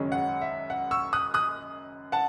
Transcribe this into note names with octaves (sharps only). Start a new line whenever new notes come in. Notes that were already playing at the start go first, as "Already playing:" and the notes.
Already playing: F#1 F#2 D#3 G#3 C#4
F#5
E5
F#5
C#6 E6
D#6 F#6
D#6 F#6
F#5 A5